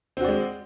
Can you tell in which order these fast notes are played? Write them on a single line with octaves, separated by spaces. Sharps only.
C4 F#4 D5 G#3